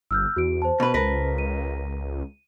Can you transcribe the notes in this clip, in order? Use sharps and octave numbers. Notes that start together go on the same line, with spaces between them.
G1 E6 F6 G6
E2 F#4 D7
C5 A5
B2 B4
C#2 A#4 B4
D#7